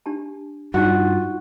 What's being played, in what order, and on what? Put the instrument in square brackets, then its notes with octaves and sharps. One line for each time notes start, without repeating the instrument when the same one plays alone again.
[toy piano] D4 G4 A5
[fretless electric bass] G2 [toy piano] D#4 D5 F#5 [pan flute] F4 [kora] F#4